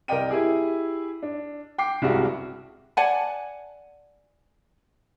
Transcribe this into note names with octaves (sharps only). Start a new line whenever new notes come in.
C2 A#4 D5 D#5 G5 D#7
E4 G4 G#4
D4
G5 D6 C7
C2 G2 G#3 F#4 G4
D5 F#5 G#5 A5